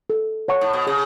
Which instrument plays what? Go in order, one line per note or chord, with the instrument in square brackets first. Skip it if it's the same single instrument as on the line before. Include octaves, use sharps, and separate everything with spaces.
[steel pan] A4
C#5 F#5 A5 C#6
[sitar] A2
B2
[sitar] C#3 [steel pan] G#4